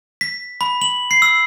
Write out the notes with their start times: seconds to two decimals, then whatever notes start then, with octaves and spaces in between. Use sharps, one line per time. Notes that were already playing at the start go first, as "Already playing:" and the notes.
0.21 B6
0.61 B5
0.82 F#7
1.11 C7
1.22 E6